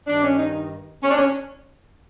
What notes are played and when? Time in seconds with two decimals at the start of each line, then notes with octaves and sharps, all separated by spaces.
0.07 G2 D#3 D4
0.24 C#4
0.39 D#4
1.03 C#4
1.11 D4
1.17 C#4